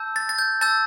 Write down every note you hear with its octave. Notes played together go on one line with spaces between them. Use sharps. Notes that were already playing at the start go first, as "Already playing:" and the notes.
Already playing: A5 E6 G6
A6
A6
G6
A5 E6 G6 A6